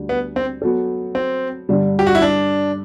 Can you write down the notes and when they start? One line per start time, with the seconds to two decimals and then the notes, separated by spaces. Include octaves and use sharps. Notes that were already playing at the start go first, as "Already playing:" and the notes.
Already playing: D2 D3 G3
0.09 B3
0.36 C4
0.62 F#3 B3 F#4 A4
1.15 C4
1.69 G2 D3 G3 D4
1.99 G4
2.07 F#4
2.15 E4
2.22 D4